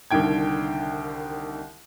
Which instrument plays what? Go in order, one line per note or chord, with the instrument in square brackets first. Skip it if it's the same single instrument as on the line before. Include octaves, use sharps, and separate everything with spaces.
[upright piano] C2 D3 D#3 G5 G#6